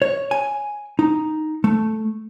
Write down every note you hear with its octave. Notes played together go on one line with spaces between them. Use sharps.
C#5
G#5
D#4
A3